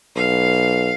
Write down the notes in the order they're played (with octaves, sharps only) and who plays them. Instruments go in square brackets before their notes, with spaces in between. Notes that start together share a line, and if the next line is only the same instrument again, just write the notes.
[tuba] B1 [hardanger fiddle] F5